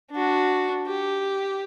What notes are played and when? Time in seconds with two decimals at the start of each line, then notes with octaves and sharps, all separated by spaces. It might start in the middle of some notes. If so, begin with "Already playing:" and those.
0.11 D4 F#4
0.87 G4